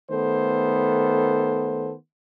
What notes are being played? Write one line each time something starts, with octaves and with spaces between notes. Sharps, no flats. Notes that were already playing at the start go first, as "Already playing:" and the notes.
D#3 A3 B3 A4 C5